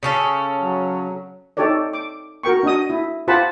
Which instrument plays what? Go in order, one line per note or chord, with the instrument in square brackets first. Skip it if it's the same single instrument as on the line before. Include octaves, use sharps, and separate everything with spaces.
[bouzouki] C#3 C#4 A4
[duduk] F#3
[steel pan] D#4 G4 A4 C#5 D5
D6
F#4 A#4 G5 C#6
D4 F#4 D#5 D#6
E4
F4 G4 C5 F#5 A5 B5